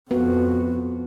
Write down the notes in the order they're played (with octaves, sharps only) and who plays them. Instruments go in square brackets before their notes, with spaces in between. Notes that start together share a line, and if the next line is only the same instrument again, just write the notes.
[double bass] F2 [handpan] B3 [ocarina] F#4